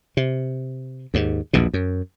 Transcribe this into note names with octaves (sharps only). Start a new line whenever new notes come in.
C3
D#2 G#2
A#1 E2 B2
F#2